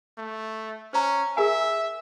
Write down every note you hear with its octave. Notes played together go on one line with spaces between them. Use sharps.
A3
C#4 C5 A#5
G#4 A#4 E5 G#5